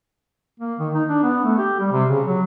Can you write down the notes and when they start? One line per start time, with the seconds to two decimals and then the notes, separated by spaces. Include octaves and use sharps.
0.60 A#3
0.79 D#3
0.95 D#4
1.09 D4
1.23 B3
1.44 A3
1.58 G4
1.80 G3
1.92 C3
2.09 C#3
2.27 F#3